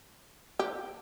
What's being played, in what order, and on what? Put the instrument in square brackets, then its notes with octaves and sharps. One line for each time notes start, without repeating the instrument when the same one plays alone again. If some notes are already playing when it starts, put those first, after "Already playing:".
[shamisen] G4